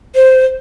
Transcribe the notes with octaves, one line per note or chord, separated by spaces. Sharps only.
C5